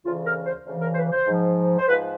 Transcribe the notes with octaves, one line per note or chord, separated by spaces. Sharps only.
D2 C#3 E3 F4
A#4
C5
D2 C#3 E3
A#4
C5
B4
C5
G#2 F3
C5
G#2 F3 B4